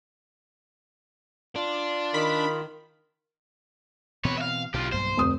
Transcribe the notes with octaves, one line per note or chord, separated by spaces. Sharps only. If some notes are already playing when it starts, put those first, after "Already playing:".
D4 F4
D#3 B5
B2 E3 C4 B4 C#5
E5 F5
B1 B2 D3 F4 G4
B1 G2 A#3 C5
F1 D2 A2 D#6